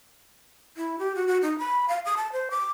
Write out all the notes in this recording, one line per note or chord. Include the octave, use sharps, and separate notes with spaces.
E4
G4
F#4
F#4
D#4
B5
F5
D#6
A5
C5
D6